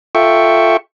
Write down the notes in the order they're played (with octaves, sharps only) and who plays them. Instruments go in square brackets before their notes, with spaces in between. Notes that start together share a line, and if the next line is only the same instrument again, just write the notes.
[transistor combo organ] F4 A4 E5 G5 C#6